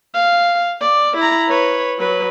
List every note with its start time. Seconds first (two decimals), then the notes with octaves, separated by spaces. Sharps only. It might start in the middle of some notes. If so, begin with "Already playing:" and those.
0.14 F5
0.81 D5
1.17 E4 A#5
1.49 B4 C#5
1.99 F#3 B4